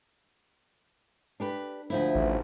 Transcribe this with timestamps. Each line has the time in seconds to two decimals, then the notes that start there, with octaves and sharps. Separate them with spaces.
1.40 D4 G4 B4
1.90 D2 F3 E4
2.15 A1